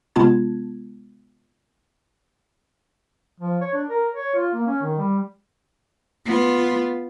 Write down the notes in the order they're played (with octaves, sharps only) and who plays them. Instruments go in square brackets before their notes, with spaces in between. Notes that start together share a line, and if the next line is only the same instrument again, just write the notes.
[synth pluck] C3 G#3 B3 F4 A5 G#6
[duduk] F3
C#5
D4
A#4
C#5
F4
A#3
C#4
D#3
G3
[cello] B3 F4